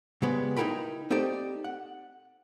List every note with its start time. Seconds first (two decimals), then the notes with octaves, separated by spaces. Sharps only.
0.22 C#3 G3 G#3 B3
0.57 D#4 E4 F#4 A#4 G5 B5
1.10 C4 D#4 G4 A4 D5
1.64 F#5